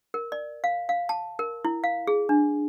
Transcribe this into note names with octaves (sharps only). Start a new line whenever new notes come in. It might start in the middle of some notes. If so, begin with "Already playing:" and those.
A#4
D5
F5
F5
A5
A#4
E4
F5
G#4
D4